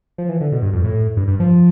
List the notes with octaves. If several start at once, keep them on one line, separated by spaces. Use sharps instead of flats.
F3
E3
D3
B2
G2
F2
A2
G2
G2
F3